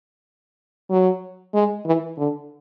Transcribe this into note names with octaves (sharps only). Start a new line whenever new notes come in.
F#3
G#3
E3
D3